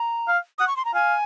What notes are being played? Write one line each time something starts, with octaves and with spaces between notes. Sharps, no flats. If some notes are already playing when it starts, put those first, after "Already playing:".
Already playing: A#5
F5
F#5 D#6
C#6
C6
A#5
F5 G#5